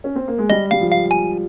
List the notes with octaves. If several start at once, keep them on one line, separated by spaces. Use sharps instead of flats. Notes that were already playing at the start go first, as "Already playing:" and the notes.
C#4
C4
A#3
G#3
G3 D#5
G3 F5
F3
F5
G#5